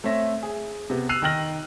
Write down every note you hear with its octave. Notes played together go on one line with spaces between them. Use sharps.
A3 C4 C#5 E5 A#6
G#4
C3 B3
E6 F#6 C7 D#7 F7
D#3 D#4 G5 F6 A#6 F#7